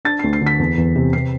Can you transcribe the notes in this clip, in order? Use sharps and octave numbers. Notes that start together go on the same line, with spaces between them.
D4 A6
D2 C7
C7
D3
B6
E2
E2
C3
C3 C7